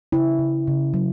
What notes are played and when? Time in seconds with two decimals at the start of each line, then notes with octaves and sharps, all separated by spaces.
0.12 C#3 E4
0.39 C#3
0.67 C#3
0.94 F#3